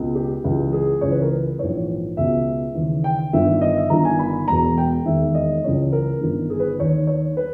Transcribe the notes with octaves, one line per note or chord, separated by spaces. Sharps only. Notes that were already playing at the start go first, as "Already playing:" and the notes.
Already playing: C#2 B2
G4
C#2 C#3 E3
G#4
C#2 C#3 E3 C#5
B4
A#4
B4
A#1 G#2 E3 C#5
C#2 B2 E5
D#2 C#3 E3
G5
G1 G2 D#3 E5
D#5
E5
G1 G2 D#3 A#5
G#5
B5
E1 E2 B2 A#5
G5
E1 D#2 D#3 E5
D#5
C#2 C#3 E3 C#5
A#4
G1 G2 D#3
G#4
B4
D#2 D#3 C#5
C#5
B4